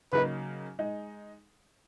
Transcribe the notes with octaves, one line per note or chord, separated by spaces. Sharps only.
C#3 F#3 A#3 D#4 B4
G#3 D#4